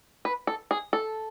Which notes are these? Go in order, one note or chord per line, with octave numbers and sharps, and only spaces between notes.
B4
A4
G#4
A4